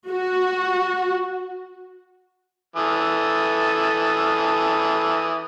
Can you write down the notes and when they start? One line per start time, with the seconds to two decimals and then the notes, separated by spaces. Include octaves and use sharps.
0.10 F#4
2.76 E3 A4 D#6